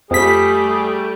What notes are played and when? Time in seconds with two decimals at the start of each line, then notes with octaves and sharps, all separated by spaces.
0.11 F2 G3 A3 G#4 B6